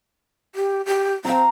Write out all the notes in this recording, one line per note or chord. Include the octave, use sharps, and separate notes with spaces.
G4
G4
C4 F5 A#5